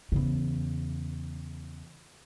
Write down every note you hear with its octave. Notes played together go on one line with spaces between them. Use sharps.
E2 C#3